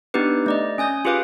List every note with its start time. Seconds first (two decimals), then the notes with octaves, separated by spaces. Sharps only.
0.14 B3 D4 D#4 G4 B4
0.46 A3 D5 D#5
0.78 C#4 G#5 D#6 G6
1.05 F4 G4 G#4 B4 F5 D6